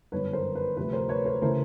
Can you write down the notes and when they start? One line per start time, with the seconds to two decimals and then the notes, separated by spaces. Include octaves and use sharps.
0.12 G1 F#2 D#3 B4 C#5
0.33 A#4 C5
0.55 B4
0.77 D2 C3 F3 B4
0.93 A#4 C5
1.09 B4 C#5
1.25 A#4 C5
1.42 C#3 E3 A3 A#4 C5